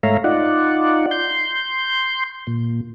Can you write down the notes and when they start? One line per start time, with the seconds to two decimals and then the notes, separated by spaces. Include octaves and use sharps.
0.03 G#2 A3 C#5 E5 F5 A#5
0.24 D#4 F4 D5 F#5
1.11 C6 G6
2.47 A#2